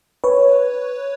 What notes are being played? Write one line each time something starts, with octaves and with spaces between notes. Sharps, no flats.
B4 C#5